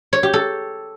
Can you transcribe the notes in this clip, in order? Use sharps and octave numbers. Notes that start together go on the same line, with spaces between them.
C#5
G4
A4